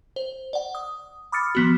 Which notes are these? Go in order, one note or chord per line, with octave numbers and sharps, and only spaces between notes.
C5
D5 F#5
D#6
B5 D6 D#6 F6 A6 C#7
F3 B3 F#4